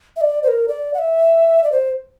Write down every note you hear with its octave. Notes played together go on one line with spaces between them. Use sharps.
E5
D5
C5
A#4
D5
F#5
E5
D5
C5